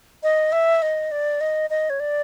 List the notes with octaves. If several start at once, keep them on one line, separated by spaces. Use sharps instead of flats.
D#5
E5
D#5
D5
D#5
D#5
C#5
D5